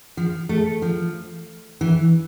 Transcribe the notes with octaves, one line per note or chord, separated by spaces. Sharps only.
F3
A3
F3
E3